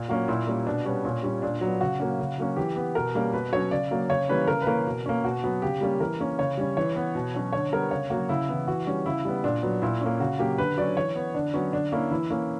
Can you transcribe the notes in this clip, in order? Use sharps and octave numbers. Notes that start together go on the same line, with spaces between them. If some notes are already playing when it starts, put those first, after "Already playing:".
Already playing: A#2
F#3 A#3 C#4 F#4
A#2 E4
G3 A#3 C#4
B2 D4
G3 B3 C#4
A#2 C#4
G3 C#4
A#2 D4
F#3 B3
C#3 F#4
F#3 A#3 C#4
C#3
F#3 A#3 C#4
E3 G4
B3
B2 A#4
G3 A#3 C#4
B2 B4
F#3 C#4 C#5
C#3 D5
F#3 A#3 C#4
C#3 C#5
E3 G3 A#3 C#4 B4
C#3 A#4
B4
E3 A#3 C#4 A#4
B2
A#3 C#4
B2 F#4
F#3 B3
C#3 G4
G3 A#3 C#4
E3 A#4
A#3 C#4
C#3 C#5
G3 C#4
E3 C#5
B3
B2
F#3 C#4
D3 C#5
G3 B3 A#4
C#3 C#5
F#3 A#3 F#4
C#3 E4
E3 B3
E3 F#4
G3 C#4
C#3 E4
G3 B3
A#2 D4
F#3 B3
A#2 E4
A#3 C#4
C#3 F#4
F#3 A#3 C#4 G4
D3 B4
F#3 C#4 D5
E3 C#5
B3
D3 D4
F#3 B3 C#4
D3 D4
A#3 C#4 E4
E3 E4
A#3 C#4